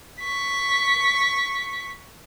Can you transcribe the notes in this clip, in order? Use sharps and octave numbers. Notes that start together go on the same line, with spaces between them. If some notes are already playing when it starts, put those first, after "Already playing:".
C#6 B6